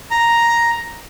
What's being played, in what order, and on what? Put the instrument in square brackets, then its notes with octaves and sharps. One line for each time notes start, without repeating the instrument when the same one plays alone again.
[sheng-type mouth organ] A#5